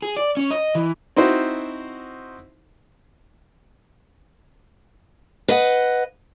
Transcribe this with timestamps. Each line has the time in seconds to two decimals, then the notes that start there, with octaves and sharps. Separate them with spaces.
0.02 G#4
0.17 D5
0.37 C#4
0.51 D#5
0.75 E3
1.17 C4 D#4 E4 F#4 C5
5.48 B4 D#5 F#5